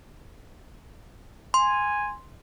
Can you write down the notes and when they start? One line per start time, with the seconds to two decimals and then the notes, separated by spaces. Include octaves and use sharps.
1.54 G#5 C6